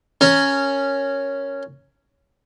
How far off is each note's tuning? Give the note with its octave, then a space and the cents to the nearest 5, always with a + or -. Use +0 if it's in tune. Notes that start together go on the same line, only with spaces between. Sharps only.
C#4 +0 A#4 -20